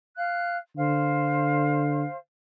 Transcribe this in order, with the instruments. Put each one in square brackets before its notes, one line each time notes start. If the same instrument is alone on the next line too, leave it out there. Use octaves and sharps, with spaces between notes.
[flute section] F5 F#6
[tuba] D3 [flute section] C5 F5